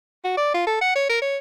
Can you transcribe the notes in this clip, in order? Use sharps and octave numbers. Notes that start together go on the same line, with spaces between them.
F#4
D5
F4
A4
F#5
C#5
A#4
C#5